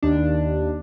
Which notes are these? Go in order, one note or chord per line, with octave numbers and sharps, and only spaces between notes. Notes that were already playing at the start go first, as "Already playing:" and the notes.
D#2 D4